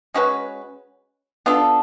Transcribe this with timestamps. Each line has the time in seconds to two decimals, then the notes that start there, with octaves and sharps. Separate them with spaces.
0.14 G#3 C#4 F#4 B4
1.46 B3 D4 F4 A4